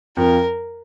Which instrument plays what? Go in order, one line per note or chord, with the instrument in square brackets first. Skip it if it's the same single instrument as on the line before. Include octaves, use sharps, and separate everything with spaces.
[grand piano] F2 F3 [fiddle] A#4